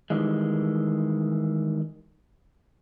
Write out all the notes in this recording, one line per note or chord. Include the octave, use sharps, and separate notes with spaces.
D#3 E3 G3 G#3